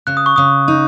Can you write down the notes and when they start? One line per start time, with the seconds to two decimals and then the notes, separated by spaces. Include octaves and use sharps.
0.07 C#3 F#6
0.17 D#6
0.26 C#6
0.36 C#3 D#6
0.68 D#4